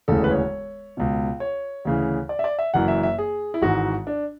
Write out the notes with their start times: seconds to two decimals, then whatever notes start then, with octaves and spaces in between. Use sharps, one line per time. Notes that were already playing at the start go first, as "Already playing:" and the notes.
0.08 E1 D2 C#3 E3 A4
0.24 B4
0.31 C#5
0.97 C#2 B2
1.40 C#5
1.85 D2 C#3 E3
2.29 D5
2.39 E5
2.44 D5
2.59 E5
2.74 F#1 F#2 E3 F#5
2.88 E5
3.03 E5
3.18 G#4
3.54 E4
3.62 G#1 G#2 E3 F#4
4.07 D4